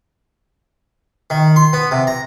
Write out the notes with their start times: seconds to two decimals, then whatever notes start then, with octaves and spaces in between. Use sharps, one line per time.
1.30 D#3
1.56 C6
1.73 B3
1.91 C3
2.07 A#5